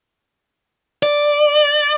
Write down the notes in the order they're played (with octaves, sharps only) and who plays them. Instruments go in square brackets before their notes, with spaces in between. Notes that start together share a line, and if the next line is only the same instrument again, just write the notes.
[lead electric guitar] D5